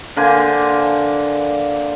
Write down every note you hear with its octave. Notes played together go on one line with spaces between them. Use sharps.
D3 A#3 C5 G#5